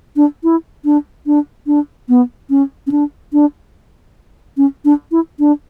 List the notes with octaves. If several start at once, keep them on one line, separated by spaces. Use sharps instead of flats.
D4
E4
D4
D4
D4
B3
C#4
C#4
D4
D4
C#4
D4
E4
D4